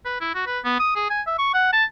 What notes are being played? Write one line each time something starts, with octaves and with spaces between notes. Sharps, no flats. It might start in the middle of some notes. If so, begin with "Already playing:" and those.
B4
E4
F#4
B4
B3
D#6
G#4
G#5
E5
C#6
F#5
A5